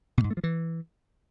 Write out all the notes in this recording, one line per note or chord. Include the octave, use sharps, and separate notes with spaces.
B2
G#2
A3
F3
E3